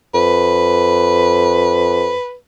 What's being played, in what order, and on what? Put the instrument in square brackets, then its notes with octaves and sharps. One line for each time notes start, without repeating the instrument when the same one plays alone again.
[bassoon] F2 [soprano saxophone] B4